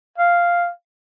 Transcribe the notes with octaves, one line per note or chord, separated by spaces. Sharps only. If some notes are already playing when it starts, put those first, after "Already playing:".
F5